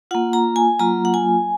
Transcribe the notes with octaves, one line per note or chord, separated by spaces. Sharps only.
A#3 F4 F#5
A#5
G#5
F#3 A#3 F4 A#5
F#5
G#5